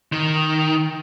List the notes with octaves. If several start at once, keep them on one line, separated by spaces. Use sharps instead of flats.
D#3